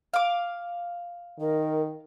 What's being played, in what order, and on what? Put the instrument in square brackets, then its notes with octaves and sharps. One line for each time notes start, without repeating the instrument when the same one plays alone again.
[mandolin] F5 D6
[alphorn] D#3 [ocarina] A#4